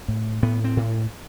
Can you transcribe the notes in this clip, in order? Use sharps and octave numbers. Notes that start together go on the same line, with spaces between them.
A2
A2 B3
C4
A2